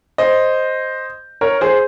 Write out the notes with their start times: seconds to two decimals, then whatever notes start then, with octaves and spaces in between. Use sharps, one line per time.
0.18 C5 D#5
1.41 A#4 C#5
1.61 G#4 C5